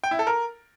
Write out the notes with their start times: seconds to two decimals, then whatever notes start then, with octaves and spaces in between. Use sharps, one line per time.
0.04 G5
0.11 E4
0.19 A4
0.27 A#4